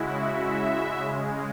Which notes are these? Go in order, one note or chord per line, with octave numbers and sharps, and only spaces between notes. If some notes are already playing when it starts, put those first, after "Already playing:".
Already playing: C#3 G#3 E4 F#4
E5
E5
C#3 G#3